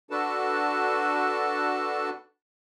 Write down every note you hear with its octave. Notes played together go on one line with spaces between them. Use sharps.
D4 F#4 A4 B4 A5